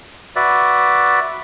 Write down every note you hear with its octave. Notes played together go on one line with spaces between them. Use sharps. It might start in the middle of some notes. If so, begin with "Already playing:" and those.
F#4 B4 D5 E5